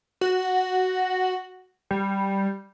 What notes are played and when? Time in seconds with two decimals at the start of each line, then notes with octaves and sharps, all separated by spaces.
0.21 F#4
1.91 G3